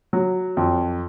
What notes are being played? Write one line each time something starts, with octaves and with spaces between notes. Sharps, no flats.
F#3
F2